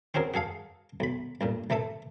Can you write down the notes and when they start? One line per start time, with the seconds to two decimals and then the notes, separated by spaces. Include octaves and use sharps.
0.14 C4 C#4 F#4 G#4 A#4
0.34 F#4 G#4 A4 F5
1.00 B1 B5
1.41 A1 G2 A#2
1.70 A1 E3 A3 A4 A5